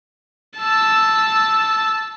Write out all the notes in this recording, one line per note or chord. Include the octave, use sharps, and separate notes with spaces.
A5 E6